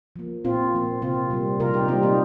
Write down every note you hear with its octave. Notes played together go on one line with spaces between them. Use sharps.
F3 A#3
A#2 C4 F4
F3 A#3
C3 C4 F4
G3 A#3
C3 F4 A#4
D#4 G4
G3 A#3 C4 F4
A#3 D#4